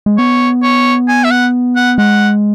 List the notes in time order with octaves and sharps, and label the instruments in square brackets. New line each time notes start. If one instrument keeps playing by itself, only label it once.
[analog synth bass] G#3
[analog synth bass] B3 [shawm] C#5
[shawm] C#5
G#5
E5
F#5
F#5
[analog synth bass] G#3 [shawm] F#5